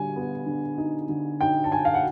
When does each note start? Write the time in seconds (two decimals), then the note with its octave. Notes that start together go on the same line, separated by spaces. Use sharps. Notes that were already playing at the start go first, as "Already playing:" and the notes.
Already playing: D3 G3 G#5
0.16 B3
0.46 D3
0.78 D#4
1.09 D3
1.41 D#4 G5
1.64 A5
1.72 D#4 G#5
1.85 F5
1.94 F#5